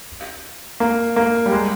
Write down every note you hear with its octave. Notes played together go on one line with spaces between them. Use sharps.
A#3
A#3
G3
G#3